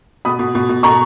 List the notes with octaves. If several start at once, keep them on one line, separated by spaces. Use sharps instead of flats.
B2 B5 D#6
B2
B2
B2
B2 A#5 C#6